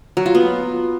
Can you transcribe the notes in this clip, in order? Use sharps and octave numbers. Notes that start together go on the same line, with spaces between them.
F#3
F4
B3